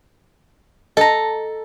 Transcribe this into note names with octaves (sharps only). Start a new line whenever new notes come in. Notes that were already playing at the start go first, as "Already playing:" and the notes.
A4 D#5 A5 A#5